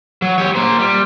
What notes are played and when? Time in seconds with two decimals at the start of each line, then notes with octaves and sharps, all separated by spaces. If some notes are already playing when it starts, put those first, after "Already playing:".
0.22 F#3
0.38 G4 C#5
0.55 A#3 C5
0.79 G3